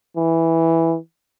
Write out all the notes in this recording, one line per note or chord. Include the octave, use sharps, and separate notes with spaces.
E3